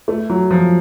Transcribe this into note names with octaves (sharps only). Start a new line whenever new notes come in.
A3
F#3
F3